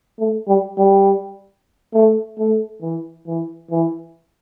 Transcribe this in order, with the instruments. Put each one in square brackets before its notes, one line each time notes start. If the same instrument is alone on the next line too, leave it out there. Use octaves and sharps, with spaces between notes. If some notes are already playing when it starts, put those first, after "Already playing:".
[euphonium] A3
G3
G3
A3
A3
E3
E3
E3